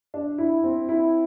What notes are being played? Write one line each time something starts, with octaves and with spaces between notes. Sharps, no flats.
D4
E4
C4
E4